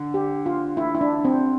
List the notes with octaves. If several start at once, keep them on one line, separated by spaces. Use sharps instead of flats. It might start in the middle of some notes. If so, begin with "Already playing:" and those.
Already playing: D3
G4
F4
E4
E4
D4
C4